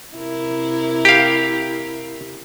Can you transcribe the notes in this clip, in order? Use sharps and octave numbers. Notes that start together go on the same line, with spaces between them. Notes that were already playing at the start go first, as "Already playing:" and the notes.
C3 E4 A#4
G4 F5